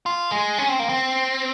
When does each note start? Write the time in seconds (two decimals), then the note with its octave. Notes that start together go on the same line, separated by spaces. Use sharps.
0.06 F4
0.32 G#3
0.59 C#4
0.69 C4
0.80 A#3
0.89 C4